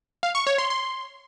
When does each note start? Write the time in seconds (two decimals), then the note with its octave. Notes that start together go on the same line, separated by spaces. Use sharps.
0.23 F5
0.35 C#6
0.47 C#5
0.58 C6
0.70 C6